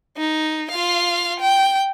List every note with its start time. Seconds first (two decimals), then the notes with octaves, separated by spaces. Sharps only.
0.17 D#4
0.71 F4 F5
1.40 G5